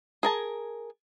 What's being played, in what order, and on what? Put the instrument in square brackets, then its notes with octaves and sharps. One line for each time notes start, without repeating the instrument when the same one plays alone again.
[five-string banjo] G#4 A#4 A5